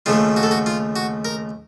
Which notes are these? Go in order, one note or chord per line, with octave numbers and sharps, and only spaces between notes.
D#2 C#3 F3 A3 F4
F#4
A4
F#4
F4
F#4
A#4